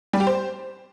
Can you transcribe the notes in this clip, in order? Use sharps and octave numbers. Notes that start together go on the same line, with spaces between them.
G3
G4
C5